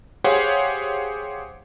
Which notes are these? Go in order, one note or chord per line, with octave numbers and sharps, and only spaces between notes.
G4 G#4 C5 C#5 F5 F#5